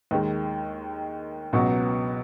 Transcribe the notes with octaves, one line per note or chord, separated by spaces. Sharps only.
D#2 D#3 G#3
C#2 B2 F#3 B3